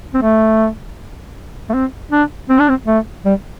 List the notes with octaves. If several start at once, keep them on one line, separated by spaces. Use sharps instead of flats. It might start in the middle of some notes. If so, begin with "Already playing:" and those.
C4
A3
A3
C4
D4
C4
D4
C4
A3
G3